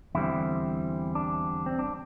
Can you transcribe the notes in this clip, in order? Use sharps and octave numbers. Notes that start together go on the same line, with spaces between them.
E2 D3 G3 C4 E4
D4
C4
D4